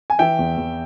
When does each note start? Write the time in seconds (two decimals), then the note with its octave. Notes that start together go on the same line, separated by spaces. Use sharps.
0.10 G#5
0.19 E3 E5 G5
0.39 E2
0.57 E2